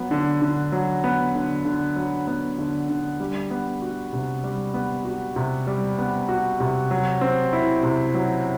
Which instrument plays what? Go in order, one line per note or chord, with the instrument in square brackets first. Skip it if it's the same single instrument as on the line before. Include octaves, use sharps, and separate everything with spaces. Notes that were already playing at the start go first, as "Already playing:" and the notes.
Already playing: [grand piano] F#3 B3
D3
D3
F#3
B3
D3
D3
F#3
B3
D3
D3
G3
B3
F#4
C3
G3
B3
F#4
C3
G3
B3
F#4
C3
F#3
C4
E4
C3
F#3